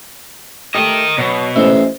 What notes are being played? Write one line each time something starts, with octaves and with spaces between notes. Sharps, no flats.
A3 G4 A#4 D#5
B2 F#3
A1 G#3 C5 E5